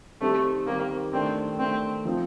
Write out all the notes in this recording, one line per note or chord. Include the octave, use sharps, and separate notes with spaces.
D#3 G3 A3 C4 D#4 G4
D#3 G3 A#3 C4 D#4 G4
D#3 A3 C4 D4
D#3 A3 C4 D4
F3 C4 D#4